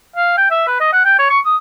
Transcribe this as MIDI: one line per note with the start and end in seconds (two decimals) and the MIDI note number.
0.16 0.37 77
0.38 0.47 79
0.51 0.64 76
0.67 0.76 71
0.81 0.91 75
0.93 1.04 78
1.05 1.17 79
1.19 1.29 73
1.30 1.39 85
1.45 1.56 87